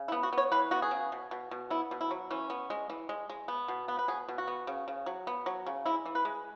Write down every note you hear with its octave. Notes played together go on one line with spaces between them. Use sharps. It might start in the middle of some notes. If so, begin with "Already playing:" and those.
Already playing: C#3
E4
B3
F#4
B3 C#5
E3 B4
B3 F#4
G#4
C#3
B2
B2
B2
B3 E4
B2
E4
F#3
E3 C#4
B3
G#3
E3
G#3
G#3
B3
B2
B3
B4
B2 G#4
B2
F#4
B3
C#3
C#3
F#3
B3
F#3
C#3
G#3 E4
E3
B4
G#3